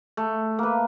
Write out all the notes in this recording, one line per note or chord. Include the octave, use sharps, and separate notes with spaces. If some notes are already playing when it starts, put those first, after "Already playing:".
A3
A#3 B4